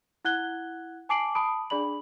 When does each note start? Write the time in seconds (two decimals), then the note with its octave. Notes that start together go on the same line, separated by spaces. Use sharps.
0.25 E4 F#5 F#6 G#6 G7
1.09 G#5 A5 D6 C7 D7 F#7
1.35 A5 B5 D#6 D7
1.70 D4 G#4 D5 B5 F#7